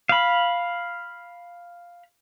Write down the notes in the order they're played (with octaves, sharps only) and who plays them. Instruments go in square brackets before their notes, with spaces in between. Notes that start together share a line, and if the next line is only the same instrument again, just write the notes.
[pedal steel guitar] F5 B5